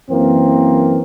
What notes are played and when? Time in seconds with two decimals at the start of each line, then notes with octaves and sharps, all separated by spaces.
0.11 F#2 E3 A#3 C4